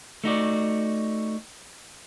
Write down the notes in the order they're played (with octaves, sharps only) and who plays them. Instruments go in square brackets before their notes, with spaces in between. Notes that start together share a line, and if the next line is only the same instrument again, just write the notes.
[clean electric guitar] A3 D#4 F#4 D5